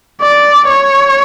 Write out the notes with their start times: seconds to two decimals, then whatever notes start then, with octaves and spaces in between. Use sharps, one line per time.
0.22 D5
0.70 C#5